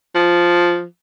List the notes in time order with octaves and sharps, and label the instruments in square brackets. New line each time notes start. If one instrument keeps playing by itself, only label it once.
[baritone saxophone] F3